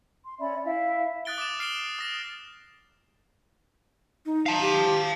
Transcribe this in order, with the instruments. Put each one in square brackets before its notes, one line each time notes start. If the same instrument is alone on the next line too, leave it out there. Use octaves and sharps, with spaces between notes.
[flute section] C6
C#4 D5 E5 B5
E4 E5 F5
[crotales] D#6 F#6 A6 D7 G7
D6 D#6 E7
F6 C7 D7 E7 G7
D#6 A#6 E7
[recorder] D#4
[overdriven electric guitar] F5 A5
[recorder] G4